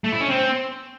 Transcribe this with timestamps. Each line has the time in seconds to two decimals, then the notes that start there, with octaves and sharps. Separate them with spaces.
0.04 A3
0.12 E4
0.21 C#4
0.29 C4